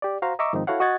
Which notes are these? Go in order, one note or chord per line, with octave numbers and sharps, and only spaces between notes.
G4 D5
F#4 C5 F5 A#5
D#5 E5 A#5 C#6 D6 E6
G#2 D#3 F3 C4 D#4
E4 F#4 A4 C#5 F5 F#5
F#4 D#5 F#5 G#6 A6